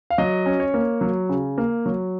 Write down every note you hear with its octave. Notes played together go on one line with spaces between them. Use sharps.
F5
F#3 D#5
C#4
C#5
A#3
F#3
C#3
A#3
F#3